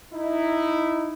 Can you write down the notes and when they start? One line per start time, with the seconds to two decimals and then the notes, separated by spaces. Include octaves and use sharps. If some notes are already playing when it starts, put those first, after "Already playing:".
0.13 D#4 E4